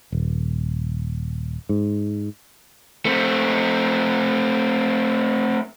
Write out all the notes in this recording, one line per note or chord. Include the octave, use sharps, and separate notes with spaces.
D#1
G#2
A3 C4